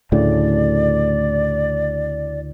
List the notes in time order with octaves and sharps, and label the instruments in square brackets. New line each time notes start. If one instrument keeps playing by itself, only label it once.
[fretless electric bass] D2 A2 C#3 [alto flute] D5